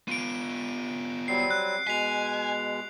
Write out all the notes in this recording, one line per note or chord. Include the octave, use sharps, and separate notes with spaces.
B3 F4 D7 D#7
F#3 G3 C4 C7
F#6
B2 G#3 G#5 B6 F7